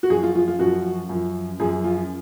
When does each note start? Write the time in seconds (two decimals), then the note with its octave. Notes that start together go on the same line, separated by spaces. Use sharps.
0.03 F#4
0.10 F#2 F3 G#4
0.23 F4
0.35 F4
0.48 F4
0.59 F#2 F3 F#4
1.09 F#2
1.14 F3
1.60 F#2 F3 G#4
1.84 F4